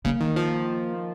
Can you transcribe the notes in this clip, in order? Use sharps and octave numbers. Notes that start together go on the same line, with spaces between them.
C#3 A#3
D#3
F3